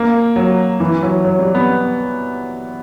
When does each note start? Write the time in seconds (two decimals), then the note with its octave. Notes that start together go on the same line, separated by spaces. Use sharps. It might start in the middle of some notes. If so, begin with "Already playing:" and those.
Already playing: A#3
0.36 F#3
0.80 E3
1.02 F#3
1.25 F#3
1.39 G3
1.55 B3